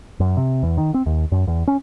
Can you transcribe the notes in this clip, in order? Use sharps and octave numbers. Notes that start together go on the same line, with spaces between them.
F#2
C3
E2
D#3
C4
D#2
F#2
E2
C#4